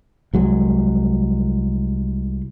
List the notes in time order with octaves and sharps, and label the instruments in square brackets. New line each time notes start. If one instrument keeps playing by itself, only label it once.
[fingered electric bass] C2 F#3 G#3